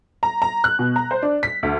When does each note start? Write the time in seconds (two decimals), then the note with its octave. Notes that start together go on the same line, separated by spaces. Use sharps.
0.23 A#5
0.42 A#5
0.64 F#6
0.79 B2
0.96 A#5
1.11 C5
1.22 D4
1.43 B6
1.63 D2